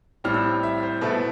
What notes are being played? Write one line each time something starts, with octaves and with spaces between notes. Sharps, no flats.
A2 G3 C4 F6
E6
E5
C5
B2 A3 E4 B4